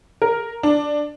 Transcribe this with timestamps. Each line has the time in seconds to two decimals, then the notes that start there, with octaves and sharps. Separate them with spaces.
0.22 A#4
0.63 D4